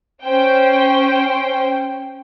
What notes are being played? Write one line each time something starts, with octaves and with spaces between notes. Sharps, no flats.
C#4 C5 G5